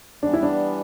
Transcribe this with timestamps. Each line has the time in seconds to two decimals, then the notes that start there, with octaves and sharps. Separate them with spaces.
0.22 E3 G3 B3 D4
0.33 E4
0.43 D4